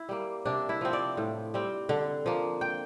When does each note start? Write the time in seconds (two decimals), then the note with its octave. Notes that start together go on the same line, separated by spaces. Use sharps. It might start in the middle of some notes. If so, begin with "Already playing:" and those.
Already playing: E4
0.09 G3 A#3
0.45 C3 D4
0.69 E4
0.81 F3 C4
0.93 D5
1.17 A2
1.54 G3 C4
1.89 D3
2.26 F3 A#3
2.61 G5